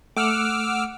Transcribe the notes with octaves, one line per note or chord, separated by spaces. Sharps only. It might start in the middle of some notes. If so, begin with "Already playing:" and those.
A3 F#5 D6 E6 F6